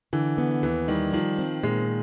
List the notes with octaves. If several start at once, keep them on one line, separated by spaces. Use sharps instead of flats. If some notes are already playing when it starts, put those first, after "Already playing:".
D3 E3
B3
D#2 E3
D#3 G3
D#3 F3
C4
A#2 G#3